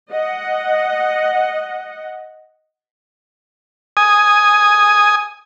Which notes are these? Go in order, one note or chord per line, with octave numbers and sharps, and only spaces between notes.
D#5 F#5
G#5 D#6